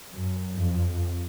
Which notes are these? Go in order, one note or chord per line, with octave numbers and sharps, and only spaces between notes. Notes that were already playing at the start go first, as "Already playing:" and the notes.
F#2
F2